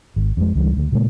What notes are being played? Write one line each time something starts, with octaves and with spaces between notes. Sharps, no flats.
G#1
F2 G#3
C#2 E3 G3
D2
A#2 C#3 G#3 A#3